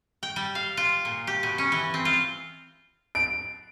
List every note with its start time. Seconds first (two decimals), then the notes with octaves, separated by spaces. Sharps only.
0.23 G5
0.36 G3
0.55 F5
0.77 F4
1.05 A#2
1.27 G4
1.43 B2
1.58 C#4
1.72 E3
1.94 C4
2.05 F4
3.15 D7